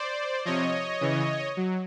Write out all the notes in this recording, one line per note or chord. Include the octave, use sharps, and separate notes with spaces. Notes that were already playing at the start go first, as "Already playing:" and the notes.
Already playing: C5 D5
C3 F3 C#5 D#5
C#3 E3
F#3